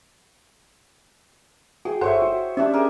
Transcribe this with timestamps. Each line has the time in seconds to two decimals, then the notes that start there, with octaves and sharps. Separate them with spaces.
1.85 F#4 G#4 G5
2.01 G1 A4 C5 C#5 E5 F#5
2.22 F#4
2.57 C#4 D4 G4 E5
2.73 G#4 A#4